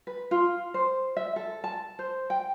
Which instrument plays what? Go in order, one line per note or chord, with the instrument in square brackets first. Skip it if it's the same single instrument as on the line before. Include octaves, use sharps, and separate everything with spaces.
[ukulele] B4
F4
C5
E5
A4
A5
C5
G5